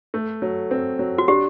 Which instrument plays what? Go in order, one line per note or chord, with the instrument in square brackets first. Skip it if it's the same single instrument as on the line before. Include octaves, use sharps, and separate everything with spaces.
[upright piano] A3
F#3
C4
F#3
[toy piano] F#4
[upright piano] D4 [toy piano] G4